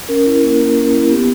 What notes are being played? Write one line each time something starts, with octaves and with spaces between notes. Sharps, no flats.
C#4 A#4
E4
A#3
A#3
C#4
E4
B3 G4